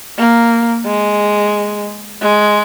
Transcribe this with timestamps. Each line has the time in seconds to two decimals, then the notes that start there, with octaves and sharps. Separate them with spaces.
0.18 A#3
0.86 G#3
2.21 G#3